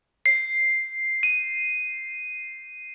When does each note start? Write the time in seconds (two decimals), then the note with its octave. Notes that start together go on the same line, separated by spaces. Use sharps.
0.26 C7
1.23 D#7